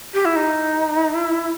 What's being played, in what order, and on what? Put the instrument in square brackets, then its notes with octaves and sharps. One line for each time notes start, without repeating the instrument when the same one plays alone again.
[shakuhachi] G4
E4
D#4
E4